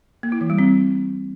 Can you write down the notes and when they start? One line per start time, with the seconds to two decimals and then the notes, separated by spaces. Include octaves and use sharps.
0.23 A#3
0.32 E4
0.41 E3
0.50 G3
0.58 C4